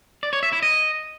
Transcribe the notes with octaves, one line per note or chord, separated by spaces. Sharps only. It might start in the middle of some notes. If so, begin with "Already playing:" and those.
D5
C#5
E5
E4
D#5